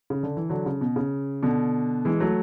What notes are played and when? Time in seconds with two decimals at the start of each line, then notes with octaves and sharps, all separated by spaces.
0.10 C#3
0.23 D3
0.37 E3
0.49 D3 F#3
0.66 C#3
0.81 B2
0.96 C#3
1.43 B2 D3
2.05 E3 G#3
2.20 F#3 A3